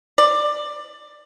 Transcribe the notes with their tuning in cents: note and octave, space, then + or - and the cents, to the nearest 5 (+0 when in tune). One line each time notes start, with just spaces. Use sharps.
D5 +15